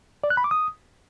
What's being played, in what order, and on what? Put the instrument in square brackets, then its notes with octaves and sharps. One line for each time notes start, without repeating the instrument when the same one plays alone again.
[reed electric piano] D5
F#6
B5
D6
D#6